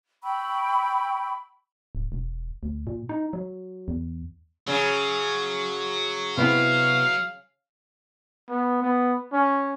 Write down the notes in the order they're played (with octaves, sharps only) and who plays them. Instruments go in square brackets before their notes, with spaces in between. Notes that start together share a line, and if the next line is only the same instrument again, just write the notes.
[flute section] G5 B5 C#6 E6
[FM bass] D1
E1
D2
A#2
D#4
F#3
E2
[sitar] C#3 [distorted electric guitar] F#3
[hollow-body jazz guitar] C3 B3 E4 [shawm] F5
[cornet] B3
B3
C#4